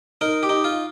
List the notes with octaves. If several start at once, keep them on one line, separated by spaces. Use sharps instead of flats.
D#4 A#4
G4
D#4
F4